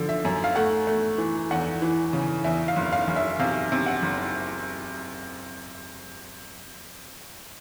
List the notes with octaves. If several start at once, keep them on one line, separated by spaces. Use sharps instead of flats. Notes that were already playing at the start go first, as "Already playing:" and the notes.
Already playing: D3 F3
E5
F#2
F5
A3 F#5
A3
E3
E2 F#5
E3
C#3
E2 E5
F5
F#1
F5
F#1
E5
C3 F5
C3
F#5
F#1